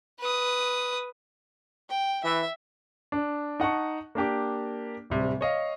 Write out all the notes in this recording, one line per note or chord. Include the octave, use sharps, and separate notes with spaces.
B4 D#6
G5
E3 E5
D4
D#4 F#5 A5 C#6
A#3 D4 G4 D6
D1 C3 G3
C#5 D#5 F5